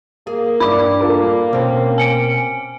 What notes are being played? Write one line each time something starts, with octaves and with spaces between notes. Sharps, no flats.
A#3 G#4
E2 G2 D4 E4 B5 D6
A#3 F4 A4 A#4
B2 C4 C#4 C5
G#5 C#7 D7